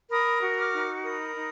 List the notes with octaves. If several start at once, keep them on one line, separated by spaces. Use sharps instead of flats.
A#4 B5 D#6
F#4
D6 F6
D#4
A#4 B5 D#6
D#4